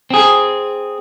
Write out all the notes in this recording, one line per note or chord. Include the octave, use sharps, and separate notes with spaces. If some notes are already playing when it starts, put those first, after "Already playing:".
C4 G#4